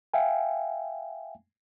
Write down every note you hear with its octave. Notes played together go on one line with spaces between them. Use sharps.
E5 F5 G5 G#5